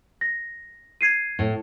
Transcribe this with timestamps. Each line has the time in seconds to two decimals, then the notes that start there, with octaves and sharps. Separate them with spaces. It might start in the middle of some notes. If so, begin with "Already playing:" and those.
0.21 A#6
1.01 G#6 C7 D#7
1.39 A2